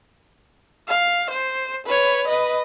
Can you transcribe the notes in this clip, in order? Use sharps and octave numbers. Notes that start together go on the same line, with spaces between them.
F5
C5
B4 C#5
B4 D#5